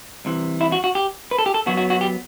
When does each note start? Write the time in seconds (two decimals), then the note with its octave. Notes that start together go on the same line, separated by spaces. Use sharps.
0.25 C2 C3 E3
0.61 E4
0.72 F#4
0.84 F#4
0.95 G4
1.31 B4
1.39 A4
1.46 G4
1.54 A4
1.66 F#2 F#3 B3 F#4
1.77 F#4
1.90 F#4
2.01 G4